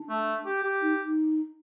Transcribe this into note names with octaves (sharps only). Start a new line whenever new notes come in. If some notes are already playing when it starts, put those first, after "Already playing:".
Already playing: D4
A3
G4
G4
D#4
D#4